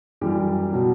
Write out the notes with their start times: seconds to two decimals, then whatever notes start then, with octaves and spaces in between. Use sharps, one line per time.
0.21 F#2 E3 G3 G4
0.72 B2 F#3